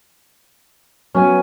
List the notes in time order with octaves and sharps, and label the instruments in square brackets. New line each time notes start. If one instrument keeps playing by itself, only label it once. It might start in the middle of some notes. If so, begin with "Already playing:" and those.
[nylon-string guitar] F#3 B3 [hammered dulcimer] C#4 G#5